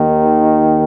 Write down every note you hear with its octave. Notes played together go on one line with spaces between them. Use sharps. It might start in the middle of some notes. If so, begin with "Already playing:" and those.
Already playing: D#2 D#3